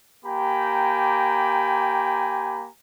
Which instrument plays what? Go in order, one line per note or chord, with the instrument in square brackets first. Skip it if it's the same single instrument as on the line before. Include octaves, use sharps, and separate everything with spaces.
[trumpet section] A#3 G4 G5 G#5 A#5 B5